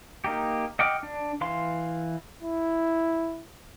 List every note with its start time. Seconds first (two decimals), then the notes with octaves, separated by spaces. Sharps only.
0.24 A#3 D#4 G4
0.79 D#5 F#5 G5 D6 F6
1.03 D4
1.41 E3 F5 C6
2.42 E4